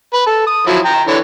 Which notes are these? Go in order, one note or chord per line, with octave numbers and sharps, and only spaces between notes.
B4
A4
D#6
F3 F#3 E4
G5 A#5
D3 E3 C#5